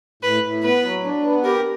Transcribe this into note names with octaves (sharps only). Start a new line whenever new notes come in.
A2 B4
A2
B3 B4
F#3
D4
B3
G4 A#4